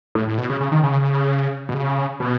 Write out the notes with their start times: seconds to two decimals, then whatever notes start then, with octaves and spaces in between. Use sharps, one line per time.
0.15 A2
0.27 A2
0.38 B2
0.50 C#3
0.61 C#3
0.72 D#3
0.83 C#3
1.69 B2
1.74 C#3
2.20 B2